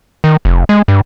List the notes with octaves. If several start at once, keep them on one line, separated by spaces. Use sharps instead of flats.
D#3
F1
G#3
G2